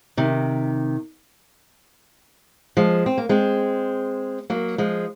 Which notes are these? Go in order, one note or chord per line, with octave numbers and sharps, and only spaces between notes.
C3 D#3
F3 G#3
C4
A#3
G#3 C4
F#3 A#3
F3 G#3